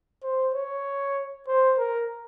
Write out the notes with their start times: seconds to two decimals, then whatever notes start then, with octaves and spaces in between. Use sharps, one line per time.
0.23 C5
0.54 C#5
1.48 C5
1.78 A#4